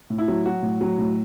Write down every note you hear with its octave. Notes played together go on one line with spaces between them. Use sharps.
A2
E4
F#3
F#3 F#4
A2
F#3
A2